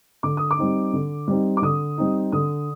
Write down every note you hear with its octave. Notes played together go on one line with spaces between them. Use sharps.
D3 D6
D#6
D6
G3 C4 D#4
D3
G3 C4 D#4
D6
D3 D#6
G3 C4 D#4
D3 D#6